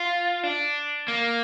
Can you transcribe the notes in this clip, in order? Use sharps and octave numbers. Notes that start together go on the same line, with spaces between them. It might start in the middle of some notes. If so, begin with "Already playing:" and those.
Already playing: F4
D4
A#3